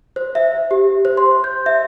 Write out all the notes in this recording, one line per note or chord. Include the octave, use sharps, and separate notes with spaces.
C5
E5
G4
C5
C6
G6
E5